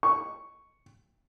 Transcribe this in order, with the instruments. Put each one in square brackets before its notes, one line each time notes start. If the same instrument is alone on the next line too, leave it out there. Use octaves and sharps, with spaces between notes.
[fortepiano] C#6